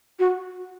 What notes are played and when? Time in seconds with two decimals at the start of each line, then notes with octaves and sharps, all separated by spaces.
0.19 F#4